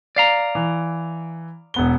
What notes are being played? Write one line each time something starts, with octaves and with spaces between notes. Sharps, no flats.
D5 F5 A#5
E3
E1 B3 G7